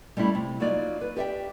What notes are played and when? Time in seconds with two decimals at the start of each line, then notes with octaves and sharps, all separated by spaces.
0.17 G3 A3 C#4 E4 G4
0.35 C3
0.60 F#3 A#3 D#4 F4 D5
1.01 B4
1.16 G4 D5 E5 G5